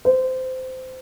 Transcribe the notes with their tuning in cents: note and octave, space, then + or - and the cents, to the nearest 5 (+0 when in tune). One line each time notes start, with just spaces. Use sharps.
C5 -20